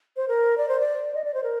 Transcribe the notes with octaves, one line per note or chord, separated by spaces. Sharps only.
C5
A#4
D5
C5
D5
D#5
D5
C5
A#4